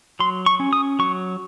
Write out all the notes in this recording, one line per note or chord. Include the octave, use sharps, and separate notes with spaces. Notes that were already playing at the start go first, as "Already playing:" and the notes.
F#3 C6
C#6
C#4
D#6
F#3 C#6